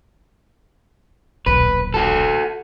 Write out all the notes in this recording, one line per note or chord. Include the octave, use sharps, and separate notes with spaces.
D#1 B1 B4
F#4 A4